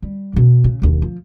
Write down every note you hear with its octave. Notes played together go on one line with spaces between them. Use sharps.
G3
E2 B2
C#3
E1 D#2
F3